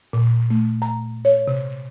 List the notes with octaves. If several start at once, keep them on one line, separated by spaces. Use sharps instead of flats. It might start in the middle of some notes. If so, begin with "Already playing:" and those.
A#2
A3
A#5
C#5
C3